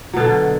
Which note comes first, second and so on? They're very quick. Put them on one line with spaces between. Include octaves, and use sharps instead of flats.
F#3 B2 D3